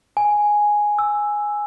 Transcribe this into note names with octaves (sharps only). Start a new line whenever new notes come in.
G#5
E6